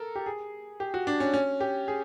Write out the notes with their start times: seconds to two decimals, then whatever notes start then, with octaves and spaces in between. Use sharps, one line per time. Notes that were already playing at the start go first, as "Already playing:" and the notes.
Already playing: A4 A#4
0.15 G4
0.26 G#4
0.80 G4
0.94 F#4
1.07 D4
1.20 C#4
1.34 C#4
1.61 G4
1.88 G#4